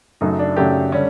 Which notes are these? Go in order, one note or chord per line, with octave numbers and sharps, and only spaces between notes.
F#2 C#3 F#3 A3 D#4
D4
F#2 C#3 F#3 A3 G4
D3 G3 C#4